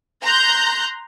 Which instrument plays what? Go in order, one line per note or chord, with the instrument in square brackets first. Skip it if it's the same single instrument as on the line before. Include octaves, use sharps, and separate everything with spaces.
[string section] A#5 C6 F#6 G6